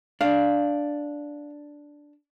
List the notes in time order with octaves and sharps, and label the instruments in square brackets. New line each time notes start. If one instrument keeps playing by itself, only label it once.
[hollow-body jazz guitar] D4 [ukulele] F5